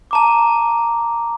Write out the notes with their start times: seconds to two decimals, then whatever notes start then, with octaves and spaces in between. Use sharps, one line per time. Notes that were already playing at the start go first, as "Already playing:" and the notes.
0.11 A5 A#5 D6